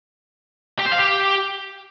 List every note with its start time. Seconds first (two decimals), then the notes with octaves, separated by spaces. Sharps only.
0.80 G4
0.86 C5
0.93 F5
0.99 G4